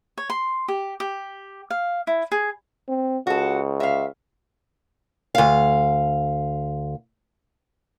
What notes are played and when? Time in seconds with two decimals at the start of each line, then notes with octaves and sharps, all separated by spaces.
0.18 C#5
0.30 C6
0.68 G4
1.00 G4
1.70 F5
2.07 E4
2.32 G#4
2.89 C4
3.27 C#2 F#4 A4
3.80 E5 F5
5.35 D2 F5